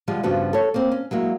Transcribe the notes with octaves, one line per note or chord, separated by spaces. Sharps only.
D3 F3 G3 G#3 F4
G2 C#3 F3 B3 D4 F#4
A4 C#5
A#3 C4
C#4
F#3 G#3 A#3 E4